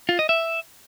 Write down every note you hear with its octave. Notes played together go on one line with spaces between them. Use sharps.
F4
D#5
E5